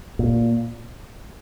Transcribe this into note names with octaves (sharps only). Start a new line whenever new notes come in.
A#2